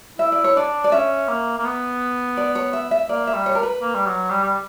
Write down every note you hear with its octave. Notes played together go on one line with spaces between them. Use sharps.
E4 E5
D5
C#5
D4 D5
D5
C#4 E5
A#3
A#3
B3
D5
C#5
E5
E5
A#3 D5
E5
G3
C#5
A#4
B4
A#3
G3
F#3
G3
G3